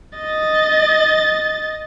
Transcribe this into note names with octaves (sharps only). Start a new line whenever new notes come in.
D#5 A6